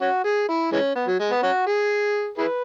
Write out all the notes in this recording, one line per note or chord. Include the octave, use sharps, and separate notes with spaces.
C#4 F#4
G#4
E4
E3 G#3 C#4
B3
F#3
G#3
B3
C#4 F#4
G#4
E4 G#4 B4